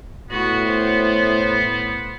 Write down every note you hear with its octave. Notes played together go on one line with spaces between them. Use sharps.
A2 B3 F#4
C5